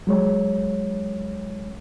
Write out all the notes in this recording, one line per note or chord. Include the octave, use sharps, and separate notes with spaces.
F#3 G#3 C#5